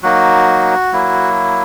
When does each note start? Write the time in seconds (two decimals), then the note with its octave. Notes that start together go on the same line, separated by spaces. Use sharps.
0.03 F#3 A#3 D#4 F#4
0.93 F#3 A#3 E4